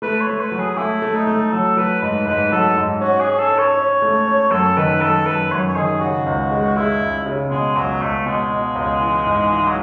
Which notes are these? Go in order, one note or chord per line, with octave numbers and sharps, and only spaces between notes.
A3 B4
C#5
A3
B4
F#3
G#4
A3 E4
A3
D#4
A3
F#3 A4
F#3 B4
G#2 B4
G#2 B4
F#3 A4
G#2
C#4 F#4
G#4
C#4
A4
C#4
C#5
C#4
A3
C#4
F#2 A4
D#3 B4
F#2 A4
F#2 B4
F#2 C#5
C#5
D#3 G#4
C#3 F#4
C#2
G#3
G#3 E4
C#2
C#3
B2 G#3
C#2 F#3
C#2 A3
B2 G#3
B2
C#2
E3
G#2
E3
F#3